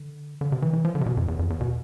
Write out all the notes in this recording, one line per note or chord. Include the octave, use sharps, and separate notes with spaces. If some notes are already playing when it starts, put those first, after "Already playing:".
Already playing: D3
D3
C3
E3
E3
F3
D3
C3
B2
F2
E2
F2
E2
B2